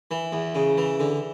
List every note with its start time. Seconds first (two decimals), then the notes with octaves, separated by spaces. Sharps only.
0.11 E3
0.33 E2
0.55 C#3
0.77 E3
1.00 D3